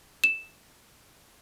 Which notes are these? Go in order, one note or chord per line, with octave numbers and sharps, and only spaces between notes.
E7